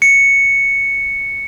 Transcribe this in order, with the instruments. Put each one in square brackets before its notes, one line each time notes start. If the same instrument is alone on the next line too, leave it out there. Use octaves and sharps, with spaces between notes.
[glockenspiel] C#7